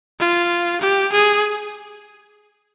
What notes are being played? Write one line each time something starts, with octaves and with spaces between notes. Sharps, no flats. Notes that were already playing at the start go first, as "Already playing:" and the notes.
F4
G4
G#4